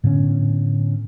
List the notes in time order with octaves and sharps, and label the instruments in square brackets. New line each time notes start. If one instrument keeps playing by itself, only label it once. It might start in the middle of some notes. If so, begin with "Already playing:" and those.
[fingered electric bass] A2 D3 B3 C#4